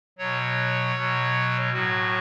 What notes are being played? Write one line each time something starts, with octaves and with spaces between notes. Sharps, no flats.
B2 F#3 C#5
B2 F#3
A2 F#3 F#4